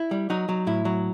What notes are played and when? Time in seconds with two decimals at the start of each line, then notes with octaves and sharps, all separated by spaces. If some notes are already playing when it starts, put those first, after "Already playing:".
Already playing: E4
0.11 G3
0.30 F#3 D#4
0.49 F#3
0.67 A2 E4
0.85 F#3